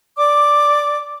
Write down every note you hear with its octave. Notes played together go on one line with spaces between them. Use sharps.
D5 D6